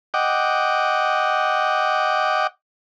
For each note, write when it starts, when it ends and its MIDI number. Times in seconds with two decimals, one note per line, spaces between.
0.14 2.47 75
0.14 2.47 78
0.14 2.47 79
0.14 2.47 86